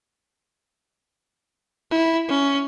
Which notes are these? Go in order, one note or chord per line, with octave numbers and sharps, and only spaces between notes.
E4
C#4